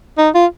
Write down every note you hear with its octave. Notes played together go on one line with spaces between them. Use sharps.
D#4
F4